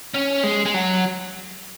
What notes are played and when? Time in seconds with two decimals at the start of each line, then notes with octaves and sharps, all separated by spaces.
0.14 C#4
0.44 G#3
0.66 G#3
0.74 F#3